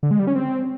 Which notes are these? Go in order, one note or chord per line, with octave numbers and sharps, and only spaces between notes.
D3
G#3
G3
C#4
C4